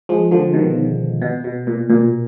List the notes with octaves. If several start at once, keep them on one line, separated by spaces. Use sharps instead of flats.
F3 G#3
D3 F3
B2 D#3
B2
B2
A#2
A#2